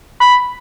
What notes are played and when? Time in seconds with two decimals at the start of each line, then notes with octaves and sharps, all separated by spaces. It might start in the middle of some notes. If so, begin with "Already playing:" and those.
0.21 B5